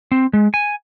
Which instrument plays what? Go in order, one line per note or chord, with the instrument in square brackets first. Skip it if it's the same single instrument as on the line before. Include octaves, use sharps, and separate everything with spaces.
[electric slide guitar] C4
G#3
G#5